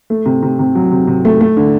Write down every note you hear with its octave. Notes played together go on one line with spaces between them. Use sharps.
A3
C3
C3
C3
F#3
C3
C3
A3
A3
D3